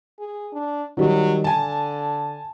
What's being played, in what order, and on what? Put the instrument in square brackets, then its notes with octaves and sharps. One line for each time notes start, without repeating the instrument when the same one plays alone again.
[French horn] G#4
D4
[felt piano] D#3 G3 [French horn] F#3
[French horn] D3 [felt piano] G#5 A5